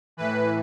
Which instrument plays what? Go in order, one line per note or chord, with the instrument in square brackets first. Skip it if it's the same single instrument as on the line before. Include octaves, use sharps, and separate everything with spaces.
[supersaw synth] A2 E3 B4